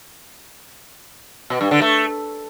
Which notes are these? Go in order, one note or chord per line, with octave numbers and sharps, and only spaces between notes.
B2
G2
D3
A3